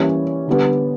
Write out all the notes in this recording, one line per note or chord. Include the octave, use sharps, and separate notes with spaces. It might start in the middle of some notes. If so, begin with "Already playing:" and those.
Already playing: E3 G3 A#3 C#4 C#5
D3 G3 B3